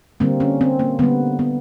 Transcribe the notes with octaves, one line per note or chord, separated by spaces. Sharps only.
D3 G3 A#3 C4
C#4
C4
A#3
D3 G3 A#3 B3
B3